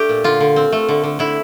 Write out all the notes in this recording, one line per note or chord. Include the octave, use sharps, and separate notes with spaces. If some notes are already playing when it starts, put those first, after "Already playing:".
Already playing: A3 D4 G4
A#2
D3 F4
D3
C4
A3
D3
D3
D3 E4